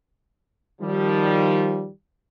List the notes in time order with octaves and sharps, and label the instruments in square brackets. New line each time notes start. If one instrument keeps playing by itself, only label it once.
[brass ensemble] D#3 F3 G3